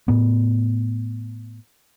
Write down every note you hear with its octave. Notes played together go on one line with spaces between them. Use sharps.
A2 B3